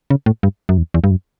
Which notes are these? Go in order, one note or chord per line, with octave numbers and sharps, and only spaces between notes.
C#3
A2
G2
F#2
E2
E2
G2
F#2